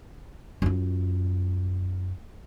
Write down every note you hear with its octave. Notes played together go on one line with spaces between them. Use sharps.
F#2 F4